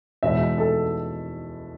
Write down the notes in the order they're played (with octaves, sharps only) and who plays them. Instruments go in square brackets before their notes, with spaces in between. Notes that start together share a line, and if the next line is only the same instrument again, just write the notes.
[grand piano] E2 B2 G#3 E5
A4